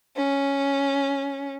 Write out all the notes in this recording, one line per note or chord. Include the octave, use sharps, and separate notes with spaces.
C#4